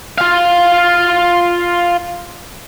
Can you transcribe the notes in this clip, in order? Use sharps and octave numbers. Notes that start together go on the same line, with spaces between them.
F4 F5